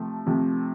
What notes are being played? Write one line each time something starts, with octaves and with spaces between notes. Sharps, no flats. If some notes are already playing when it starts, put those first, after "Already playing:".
Already playing: C3 F3 A3
C3 F3 A3